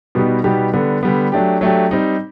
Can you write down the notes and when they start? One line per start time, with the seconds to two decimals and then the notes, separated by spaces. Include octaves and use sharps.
0.15 B2 G3 B3 D#4 G4
0.44 B2 G3 B3 D#4 G4
0.73 D3 G3 B3
1.03 D3 G3 B3
1.32 F#3 A3 D4 G4
1.61 F#3 A3 D4 G4
1.91 G3 C4 D#4